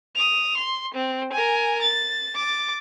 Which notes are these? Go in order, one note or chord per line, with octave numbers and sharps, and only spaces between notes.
D#6 F7
C6
C4
A#4 G#5
A6
D6 A6